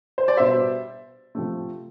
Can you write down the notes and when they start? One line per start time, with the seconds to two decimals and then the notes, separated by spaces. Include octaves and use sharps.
0.18 C5
0.28 D5
0.37 B2 G3 C5 E5
1.35 C3 F3 A3